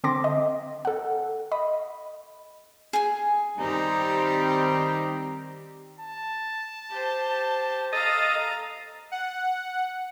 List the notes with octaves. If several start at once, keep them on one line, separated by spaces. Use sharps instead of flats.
D3 C4 A5 C6 D6 A#6
D#5
A4 F#5
D#5 B5
G#4 G#5
D#3 G3 C4 D#4 G4
A5
G4 C5
A4 D#5 F5 A#5
F#5